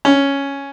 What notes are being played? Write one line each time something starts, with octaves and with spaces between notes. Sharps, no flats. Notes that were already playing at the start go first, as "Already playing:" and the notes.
C#4